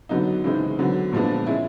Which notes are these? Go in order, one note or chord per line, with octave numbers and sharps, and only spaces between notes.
D3 F#3 B3 D#4
C#3 E3 G#3 C4 D#4
D3 F#3 B3
A#2 F3 G#3 B3 D4
G#3 C#4 E4